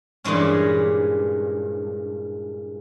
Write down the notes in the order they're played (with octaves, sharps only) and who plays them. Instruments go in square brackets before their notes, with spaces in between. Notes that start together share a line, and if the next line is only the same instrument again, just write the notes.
[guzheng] G2 A#2 E3 G#3 C#4